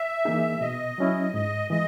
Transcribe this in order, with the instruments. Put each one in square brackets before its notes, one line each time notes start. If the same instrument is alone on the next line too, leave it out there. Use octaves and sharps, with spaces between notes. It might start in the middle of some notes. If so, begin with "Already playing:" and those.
Already playing: [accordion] E5
[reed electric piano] E3 A#3 D#4 G#4
[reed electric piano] B2 [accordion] D#5
[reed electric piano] F#3 C#4 E4
[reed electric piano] G#2 [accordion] D#5
[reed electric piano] E3 G#3 [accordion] D#5